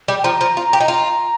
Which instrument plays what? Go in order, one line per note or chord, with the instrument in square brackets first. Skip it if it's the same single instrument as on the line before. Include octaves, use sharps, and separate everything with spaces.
[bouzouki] G3
[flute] G5
[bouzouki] F3 [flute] A#5
[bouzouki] F3
F4
G4
D#4
[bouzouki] F4 [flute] A#5